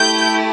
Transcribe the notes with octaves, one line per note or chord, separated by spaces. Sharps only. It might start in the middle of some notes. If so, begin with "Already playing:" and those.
Already playing: A3 E4 G4 G6